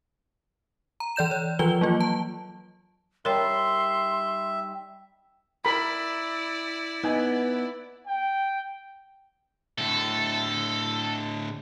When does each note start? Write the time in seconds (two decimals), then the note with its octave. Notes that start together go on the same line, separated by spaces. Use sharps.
1.00 A#5
1.16 E3 D5 G6 E7
1.31 C#5
1.59 E3 F3 F4 B4 G7
1.81 F#3 A#3 F4
2.00 A5
3.25 G3 D#4 A#4 C#5 E5 G5 C6
5.65 E4 A#4 D5 B5
7.04 B3 D#4 G#5
8.07 G5
9.78 A2 D3 A4